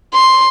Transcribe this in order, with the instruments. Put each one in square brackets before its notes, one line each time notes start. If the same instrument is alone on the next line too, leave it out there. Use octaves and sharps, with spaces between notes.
[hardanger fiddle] C6